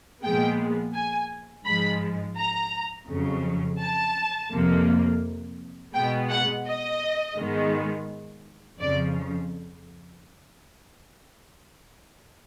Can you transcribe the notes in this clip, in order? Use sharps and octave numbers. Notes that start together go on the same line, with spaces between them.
A#2 F3 G#3 B3 G5
G#5
G#2 F3 G#3 B5
A#5
F2 C#3 F#3
A5
F2 C3 F3 A#3
B2 G#3 B3 G5
F#5
D#5
G#2 D#3 G#3 B3
F2 C#3 F3 D5